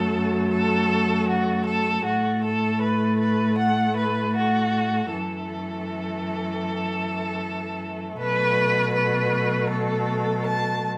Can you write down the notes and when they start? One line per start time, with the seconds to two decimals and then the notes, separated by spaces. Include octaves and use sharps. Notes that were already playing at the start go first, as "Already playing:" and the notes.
Already playing: F#2 F#3 A3 A4
0.51 A4
1.28 F#4
1.66 A4
2.05 A2 A3 F#4
2.43 A4
2.81 B4
3.19 B4
3.58 F#5
3.96 B4
4.35 F#4
5.11 F#2 E3 A3 A4
8.17 B2 F#3 A3 B4
8.94 B4
9.70 A4
10.47 A5